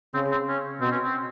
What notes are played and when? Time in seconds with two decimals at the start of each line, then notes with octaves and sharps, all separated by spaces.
0.14 C#3 C4
0.31 C4
0.48 C#4
0.80 B2 C4
0.91 C#4
1.03 C4